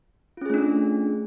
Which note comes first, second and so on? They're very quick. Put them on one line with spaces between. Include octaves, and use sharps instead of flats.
F4 C#4 G#4 A3 D4